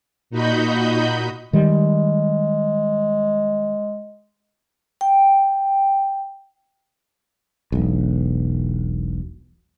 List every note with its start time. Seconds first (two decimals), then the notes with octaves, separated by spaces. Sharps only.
0.30 A#2 D#4 F#4 D#5 B5 G6
1.53 D#3 G3 G#3
5.01 G5
7.72 E1 B1